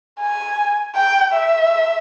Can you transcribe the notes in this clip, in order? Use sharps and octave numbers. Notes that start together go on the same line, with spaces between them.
G#5
G5
E5